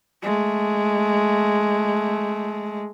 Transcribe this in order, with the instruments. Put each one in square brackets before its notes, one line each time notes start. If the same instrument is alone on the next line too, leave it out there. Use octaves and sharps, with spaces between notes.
[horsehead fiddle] G#3 A3